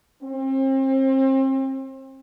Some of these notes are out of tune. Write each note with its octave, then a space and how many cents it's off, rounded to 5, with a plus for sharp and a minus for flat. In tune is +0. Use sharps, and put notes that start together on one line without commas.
C4 +35